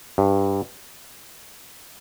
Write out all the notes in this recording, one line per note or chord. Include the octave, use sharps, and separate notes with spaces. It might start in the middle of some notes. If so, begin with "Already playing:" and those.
G2